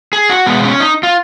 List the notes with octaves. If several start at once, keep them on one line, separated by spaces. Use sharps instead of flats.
G#4
F#4
B2 G#3 B3
C#4
D#4
F4